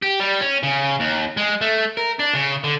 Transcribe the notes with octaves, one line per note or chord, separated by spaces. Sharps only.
G4
G3
C#4
C#3
D#2
G#3
A3
A#4
D4
C#3
D3